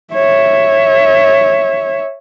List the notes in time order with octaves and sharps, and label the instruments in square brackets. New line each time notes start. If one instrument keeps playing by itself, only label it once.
[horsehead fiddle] C#5 E5